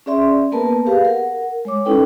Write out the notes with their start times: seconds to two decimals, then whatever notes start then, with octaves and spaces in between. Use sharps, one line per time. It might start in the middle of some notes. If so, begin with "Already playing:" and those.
0.06 C#4 G#4 D5 E5 C6
0.52 A#3 B3 A#4 B4 A5
0.86 G4 G#4 B4 F5
1.05 A#4 F#5
1.65 G#3 C#5 D6
1.85 C#4 D#4 E4 A4 B4 G5